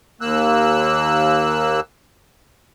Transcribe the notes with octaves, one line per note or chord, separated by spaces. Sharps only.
D#2 A#3 E6 F#6